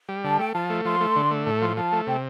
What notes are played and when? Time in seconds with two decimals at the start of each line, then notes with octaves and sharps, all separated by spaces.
0.09 G3
0.24 D3 A5
0.39 A3 G5
0.55 F3 A5
0.70 A3
0.85 F3 C6
1.00 A3
1.16 D3
1.31 A3
1.46 A2 A5
1.62 F3 C6
1.77 F3 A5
1.92 A3
2.07 C3 G5